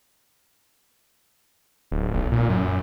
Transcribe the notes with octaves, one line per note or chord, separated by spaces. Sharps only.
D1
B1
A#2
F#2